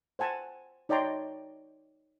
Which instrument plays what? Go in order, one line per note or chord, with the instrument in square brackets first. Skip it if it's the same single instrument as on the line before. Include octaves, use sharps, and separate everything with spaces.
[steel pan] C5 F#5 G#5 A5
D#4 C#5 D5 G5 A#5 C6